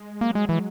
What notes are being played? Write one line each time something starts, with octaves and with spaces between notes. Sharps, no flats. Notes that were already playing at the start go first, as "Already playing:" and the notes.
Already playing: G#3
F#3 A#3
G#3
E3